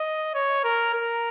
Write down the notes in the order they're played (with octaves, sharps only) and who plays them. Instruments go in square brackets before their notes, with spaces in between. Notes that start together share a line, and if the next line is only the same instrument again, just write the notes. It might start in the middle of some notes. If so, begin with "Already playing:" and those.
Already playing: [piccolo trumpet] D#5
C#5
A#4
A#4